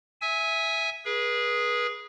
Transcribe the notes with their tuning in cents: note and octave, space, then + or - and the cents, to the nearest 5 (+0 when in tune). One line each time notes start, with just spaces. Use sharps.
E5 +0 G#5 +0 E6 -35
G#4 +0 B4 -35